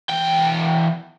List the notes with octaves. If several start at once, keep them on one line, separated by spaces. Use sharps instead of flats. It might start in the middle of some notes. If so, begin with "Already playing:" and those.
E2 G5